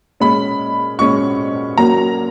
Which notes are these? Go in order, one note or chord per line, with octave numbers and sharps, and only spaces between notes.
A#2 G#3 C#4 B5
A#2 G#3 C#4 C#6
A#2 F#3 A#3 C#4 A#5